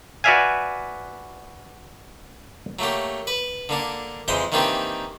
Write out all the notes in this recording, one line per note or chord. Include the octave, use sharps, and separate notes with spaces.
F#4 B4 D5 E5 F5 G#5
F#3 A3 A#3 G4
B4
D3 A#3 D4
F2 E3 G#3 C5 C6
D#3 E3 A#3 C4 D4 G4